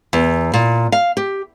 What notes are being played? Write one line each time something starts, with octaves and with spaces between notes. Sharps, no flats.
E2
A#2
F5
G4